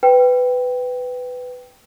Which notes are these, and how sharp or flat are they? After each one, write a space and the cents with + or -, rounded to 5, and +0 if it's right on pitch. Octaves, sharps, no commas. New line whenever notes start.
B4 +15 G5 +0